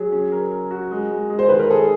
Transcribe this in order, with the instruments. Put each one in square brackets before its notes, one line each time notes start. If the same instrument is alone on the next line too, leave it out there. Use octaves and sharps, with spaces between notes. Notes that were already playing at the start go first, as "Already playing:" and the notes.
Already playing: [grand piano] F#3 [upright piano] G#4
[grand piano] C#4
A#4
A#4
F#4
G#3
G#3
G#3
[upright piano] C5
[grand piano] D#3 [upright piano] B4
[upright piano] A#4
[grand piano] G#4 [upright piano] A4